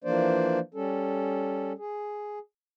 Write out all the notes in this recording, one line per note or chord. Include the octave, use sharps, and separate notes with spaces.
E3 F3 A#3 D4 C5 D5
G3 C#4 A4
G#4